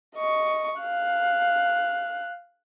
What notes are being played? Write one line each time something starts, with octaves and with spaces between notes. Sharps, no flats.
D#5 C#6
F5 F#6